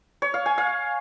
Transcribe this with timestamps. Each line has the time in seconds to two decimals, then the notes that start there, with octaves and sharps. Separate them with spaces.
0.22 C#5
0.34 F5
0.46 G#5
0.58 F5